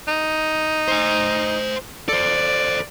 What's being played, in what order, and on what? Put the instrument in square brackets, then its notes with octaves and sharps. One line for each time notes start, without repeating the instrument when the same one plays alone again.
[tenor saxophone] D#4
[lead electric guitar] C5 G#5
[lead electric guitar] A4 C5 [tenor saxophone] D5